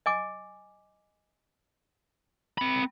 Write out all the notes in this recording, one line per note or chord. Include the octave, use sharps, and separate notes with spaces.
D#5 G#5 D6
C4 B5